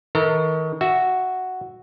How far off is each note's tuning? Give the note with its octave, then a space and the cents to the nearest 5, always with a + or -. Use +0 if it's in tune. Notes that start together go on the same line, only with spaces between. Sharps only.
D#3 +35 A#4 -45
F#4 +0 E5 +0